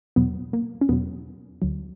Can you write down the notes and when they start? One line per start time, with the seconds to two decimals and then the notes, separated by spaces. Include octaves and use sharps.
0.16 E2 B2 F#3 B3
0.53 A#3
0.81 C#4
0.89 E2 B2 F#3 B3
1.62 D2 D3 F#3